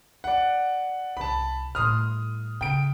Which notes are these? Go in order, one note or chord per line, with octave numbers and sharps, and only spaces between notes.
D5 F#5
C2 A5 B5
A2 G3 C6 D#6 F6
C#3 G5 D7